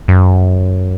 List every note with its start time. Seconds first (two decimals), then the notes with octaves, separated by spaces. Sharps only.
0.08 F#2